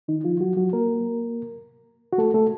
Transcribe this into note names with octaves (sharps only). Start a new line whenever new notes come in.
D#3 D#4
F3 F4
F#3 F#4
F#3 F#4
A#3 A#4
F#4
A3 A4
A3 A4